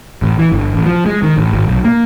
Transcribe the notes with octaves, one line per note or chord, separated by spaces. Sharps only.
A1
E3
G1
A1
F3
G#3
D#3
A1
G#1
B1
A#3